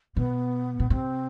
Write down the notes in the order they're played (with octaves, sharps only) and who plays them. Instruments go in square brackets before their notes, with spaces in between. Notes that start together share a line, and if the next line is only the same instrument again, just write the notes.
[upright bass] B2 [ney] B3
[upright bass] B2
[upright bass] C3 [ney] C4